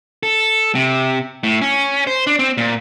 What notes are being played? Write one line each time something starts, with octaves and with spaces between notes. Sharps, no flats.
A4
C3
A2
C#4
C5
D4
C4
A#2